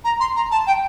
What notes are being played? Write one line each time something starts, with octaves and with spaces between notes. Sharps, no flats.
A#5
C6
A#5
A5
G5